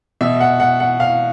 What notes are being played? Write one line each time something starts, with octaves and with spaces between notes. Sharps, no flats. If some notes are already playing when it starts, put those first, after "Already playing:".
B2 E5
F#5
F#5
F#5
F5